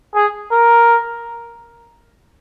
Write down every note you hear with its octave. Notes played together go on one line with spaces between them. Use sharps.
G#4
A#4